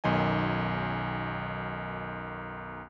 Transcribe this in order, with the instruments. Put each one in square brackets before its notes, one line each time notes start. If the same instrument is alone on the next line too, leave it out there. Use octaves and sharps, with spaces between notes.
[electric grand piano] B1 F#2 D#3 D#5 G#5